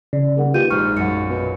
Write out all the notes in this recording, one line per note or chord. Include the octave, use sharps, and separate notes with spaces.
C#3 D5
D#1 G#4 A#4 F#5
D#2 F4 G4 B4 G6 D#7
A#1 G#2 C#6 F6
F#2 F#5 C#7
B2